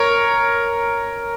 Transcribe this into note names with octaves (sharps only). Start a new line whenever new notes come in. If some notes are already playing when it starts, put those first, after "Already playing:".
Already playing: A#4 C#5